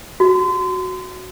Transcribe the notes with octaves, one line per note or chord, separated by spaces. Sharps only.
F#4